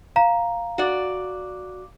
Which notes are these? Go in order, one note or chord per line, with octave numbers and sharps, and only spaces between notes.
F5 A#5
F#4 D5